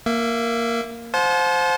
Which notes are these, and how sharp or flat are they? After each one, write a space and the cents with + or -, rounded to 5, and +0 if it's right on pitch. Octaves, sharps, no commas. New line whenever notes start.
A#3 +0 E5 +20
C5 +0 F#5 -45 A5 -35